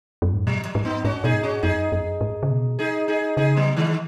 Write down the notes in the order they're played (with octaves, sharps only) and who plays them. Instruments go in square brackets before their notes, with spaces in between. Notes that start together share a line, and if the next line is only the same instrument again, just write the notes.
[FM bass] F#2
G#2
[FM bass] B2 [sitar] F#3
[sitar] F#3
[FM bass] G#2
[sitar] B3 D#4
[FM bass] G#2 [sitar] C#4 F#4
[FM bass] B2 [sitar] D#4 G#4
[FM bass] G#2
[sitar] C#4 F#4
[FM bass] F#2 [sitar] D#4 G#4
[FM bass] F#2
G#2
C#3
B2
[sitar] D#4 G#4
D#4 G#4
[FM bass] C#3 [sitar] D#4 G#4
[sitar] F#3 B3
D#3 G#3